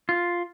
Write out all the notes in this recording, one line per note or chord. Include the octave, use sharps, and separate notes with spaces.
F4